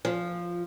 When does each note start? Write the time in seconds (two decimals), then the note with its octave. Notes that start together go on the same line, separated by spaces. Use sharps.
0.05 F3